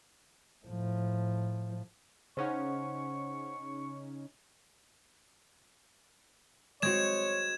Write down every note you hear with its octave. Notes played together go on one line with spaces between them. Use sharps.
A2 F3
C#3 C#4 D#4 C5 F#5 C#6
G#3 C4 F#4 C#5 G#6 E7